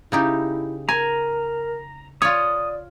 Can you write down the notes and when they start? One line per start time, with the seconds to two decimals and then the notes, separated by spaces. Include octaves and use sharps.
0.12 C#3 D#4 E4 G4
0.89 A#4 G#5 A#5
2.22 F4 C#5 D5 D#6